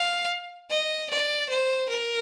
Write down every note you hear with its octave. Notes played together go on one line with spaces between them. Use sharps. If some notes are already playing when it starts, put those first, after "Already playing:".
Already playing: F5
D#5
D5
C5
A#4